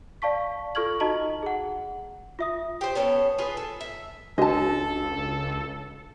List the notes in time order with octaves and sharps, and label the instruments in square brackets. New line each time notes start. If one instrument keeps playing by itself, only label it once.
[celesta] D5 F5 A5 C#6 B6
F4 A4 C#6 F6 G#6 F#7
D#4 F#4 D#5 A5 A#5 F#7
G#4 F#5
F4 E5 D#6
[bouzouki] G4 C5
B3 C#4 A4
F4 G#4 B4
A4
E5
[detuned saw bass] C#2 [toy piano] D4 F#4 [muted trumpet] A4 [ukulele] D#5 A5